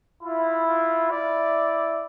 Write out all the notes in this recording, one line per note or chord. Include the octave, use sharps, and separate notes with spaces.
E4 F4
F4
E4 D5